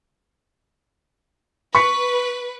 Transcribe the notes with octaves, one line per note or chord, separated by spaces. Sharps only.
B4 C#6 B6 C#7